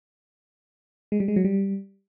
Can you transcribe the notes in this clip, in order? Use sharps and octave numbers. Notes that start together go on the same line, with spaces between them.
G#3
G3
G#3
F#3
G3